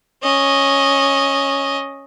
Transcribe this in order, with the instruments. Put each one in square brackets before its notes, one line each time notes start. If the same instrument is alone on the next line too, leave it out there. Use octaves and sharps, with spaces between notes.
[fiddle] C#4 D#5